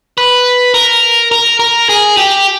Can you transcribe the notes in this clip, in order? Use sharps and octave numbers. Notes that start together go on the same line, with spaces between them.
B4
A#4
A#4
A#4
G#4
G4